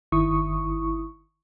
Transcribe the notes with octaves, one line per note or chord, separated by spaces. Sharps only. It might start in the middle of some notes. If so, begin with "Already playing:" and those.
G1 D#3 E4 C#6 D#6